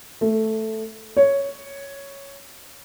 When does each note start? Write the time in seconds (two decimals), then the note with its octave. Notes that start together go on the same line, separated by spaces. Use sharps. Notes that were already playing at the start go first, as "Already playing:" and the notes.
0.21 A3
1.17 C#5